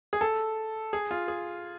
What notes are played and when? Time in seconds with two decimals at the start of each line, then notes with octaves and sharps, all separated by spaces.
0.13 G#4
0.21 A4
0.93 G#4
1.11 F4
1.28 G#4